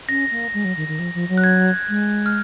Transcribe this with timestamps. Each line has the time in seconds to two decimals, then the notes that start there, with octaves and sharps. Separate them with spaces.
0.09 C#4 A#6
0.31 A#3
0.54 G#3
0.64 F#3
0.77 D#3
0.88 D#3
0.99 F3
1.14 F3
1.29 F#3
1.38 F#6
1.44 G#6
1.89 G#3
2.26 F6